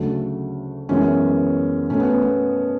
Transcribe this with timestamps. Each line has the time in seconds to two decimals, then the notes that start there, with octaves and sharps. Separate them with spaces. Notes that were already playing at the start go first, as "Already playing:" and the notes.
Already playing: D2 C#3 F#3 A3
0.89 F#2 E3 G#3 B3 C#4
1.90 B2 A3 C#4
2.00 B3
2.22 B3